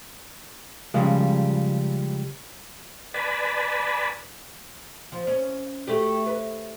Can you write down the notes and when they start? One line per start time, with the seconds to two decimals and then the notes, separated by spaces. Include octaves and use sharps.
0.94 C#3 F3 G3 G#3
3.14 B4 D5 G#5 A5 B5
5.12 F3
5.27 C#4
5.87 A3 F#4 G4
6.26 B4